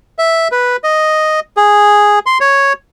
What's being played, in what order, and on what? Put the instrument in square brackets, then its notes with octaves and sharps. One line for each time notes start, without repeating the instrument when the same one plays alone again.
[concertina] E5
B4
D#5
G#4
C6
C#5